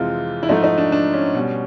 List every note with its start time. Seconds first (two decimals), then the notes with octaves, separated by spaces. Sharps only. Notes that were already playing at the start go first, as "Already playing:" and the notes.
Already playing: F2 C3 E3 G#3 F4
0.43 E4
0.49 G#2 F3 A3 D#4
0.64 D#4
0.78 D4
0.92 D4
1.14 C#4
1.35 B2 G3